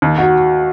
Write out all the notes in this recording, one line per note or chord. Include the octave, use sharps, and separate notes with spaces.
D#2
F#4